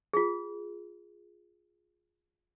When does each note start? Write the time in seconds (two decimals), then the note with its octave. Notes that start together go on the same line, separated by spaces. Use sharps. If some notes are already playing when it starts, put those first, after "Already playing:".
0.13 F4 G#4